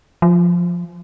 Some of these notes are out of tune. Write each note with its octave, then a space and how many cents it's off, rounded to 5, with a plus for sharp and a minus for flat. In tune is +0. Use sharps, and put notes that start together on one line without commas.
F3 +5